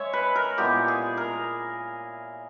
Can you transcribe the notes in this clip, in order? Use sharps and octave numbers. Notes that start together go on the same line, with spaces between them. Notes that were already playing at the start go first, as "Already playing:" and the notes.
Already playing: G#3 C#5 E5
B4
A#4
A#2 G#3 B3 E4 G4
G#4
A#4